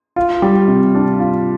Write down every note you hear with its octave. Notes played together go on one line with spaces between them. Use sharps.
F4
G3
C3
D4
F4